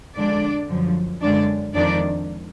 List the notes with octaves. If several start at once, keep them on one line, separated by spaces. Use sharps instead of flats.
F2 D3 G#3 D4 D5
F#2 D3 F3
F#2 D3 G#3 D4 D5
F2 D#3 G#3 D4 D5